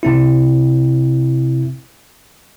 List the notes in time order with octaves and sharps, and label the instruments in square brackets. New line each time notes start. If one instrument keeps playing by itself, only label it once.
[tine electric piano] C3 C4 E4